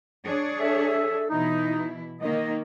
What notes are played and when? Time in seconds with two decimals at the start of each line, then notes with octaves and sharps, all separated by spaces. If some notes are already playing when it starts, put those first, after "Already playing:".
0.24 D4 G#4 C#5
0.60 A4 E5
1.30 B2 E3 D#4 E4
2.22 D#3 A#3 D#5